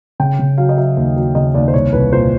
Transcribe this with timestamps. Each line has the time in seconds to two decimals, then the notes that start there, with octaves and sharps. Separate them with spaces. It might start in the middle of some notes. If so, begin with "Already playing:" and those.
0.20 C#3 G5
0.39 C#3
0.58 F#3 F5
0.69 D#5
0.77 F#3 E5
0.97 D#2
1.16 F#3
1.35 C#3 D#5
1.54 D#2 D5
1.68 C5
1.73 C2 C#5
1.93 C2 B4
2.12 A#2 C5